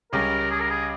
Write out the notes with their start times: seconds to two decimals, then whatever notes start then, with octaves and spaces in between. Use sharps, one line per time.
0.12 C#2 C#3 G3 C#4 G4 A#4
0.50 G#4
0.60 A#4
0.70 G#4